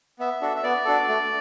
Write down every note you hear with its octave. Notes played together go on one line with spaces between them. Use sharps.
B3 E5
D4 F#4 A4
E5
B3 D5
D4 F#4 A4
A3